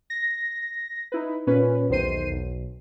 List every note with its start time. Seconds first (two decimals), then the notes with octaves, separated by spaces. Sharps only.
0.10 A#6
1.12 D#4 E4 B4
1.47 A#2 C#4 B4
1.89 B1 E2 D#3 C5 C7 D#7
2.31 B1